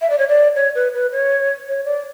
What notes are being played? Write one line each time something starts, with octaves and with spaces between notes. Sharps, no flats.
E5
D5
C#5
D5
C#5
B4
B4
C#5
C#5
D5